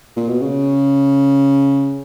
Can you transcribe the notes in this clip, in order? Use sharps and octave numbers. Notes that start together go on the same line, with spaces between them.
A#2
B2
C#3